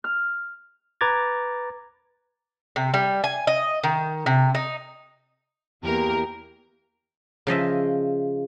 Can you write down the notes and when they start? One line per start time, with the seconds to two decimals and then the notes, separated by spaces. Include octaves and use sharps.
0.04 F6
1.01 B4 A#5 D6 G#6 A6
2.76 C3
2.94 G3
3.24 G#5
3.47 D#5
3.83 D#3
4.26 C3
4.55 D#4
5.84 E2 A#3 G4 A#4
7.47 C#3 F3 D#5 E5